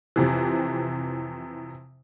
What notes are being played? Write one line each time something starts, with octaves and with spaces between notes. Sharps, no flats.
F2 C3 E3